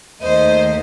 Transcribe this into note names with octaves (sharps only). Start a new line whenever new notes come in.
D#2 D#3 A3 C5 D#5